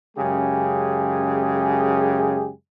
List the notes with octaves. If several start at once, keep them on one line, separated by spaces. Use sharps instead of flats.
F#2 C#3 G#3 G4 G#4